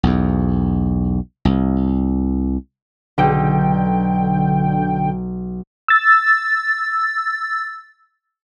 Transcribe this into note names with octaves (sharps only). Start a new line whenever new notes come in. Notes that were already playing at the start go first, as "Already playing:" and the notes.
B1 E2
C2
B1 D3 G5
E6 A6